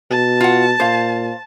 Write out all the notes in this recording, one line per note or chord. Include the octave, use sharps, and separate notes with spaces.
B2 A5
F4 F#5
A#2 C5 F5